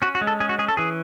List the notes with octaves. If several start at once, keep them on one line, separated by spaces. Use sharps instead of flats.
C#4 F#4
F#4
G#3
A4
C#4 G#4
F#4
C#4 G#4
A4
E3 G#4